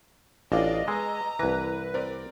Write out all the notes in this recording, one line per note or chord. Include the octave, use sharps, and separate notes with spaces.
A1 D4 F4 D5 D#5 D6
G#3 B3 G#5 A#5 E6
C2 E3 B4 A#6
C4 A#4 D5